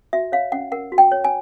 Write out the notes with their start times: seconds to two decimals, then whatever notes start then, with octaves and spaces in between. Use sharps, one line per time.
0.13 F#4 E5
0.32 C#5 F5
0.52 C#4 F#5
0.72 A#4 F#5
0.92 F#4
0.98 G5
1.12 C#5
1.24 G#5